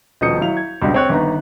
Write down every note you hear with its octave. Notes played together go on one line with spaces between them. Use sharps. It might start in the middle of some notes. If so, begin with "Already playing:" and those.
D#1 B2 F3 D#6 G6 C#7
F#3 E4 F5 F7
G#6
C#2 G2 B2 D4 B5
C4 C#5 F#6
G1 D#3 B3 A#5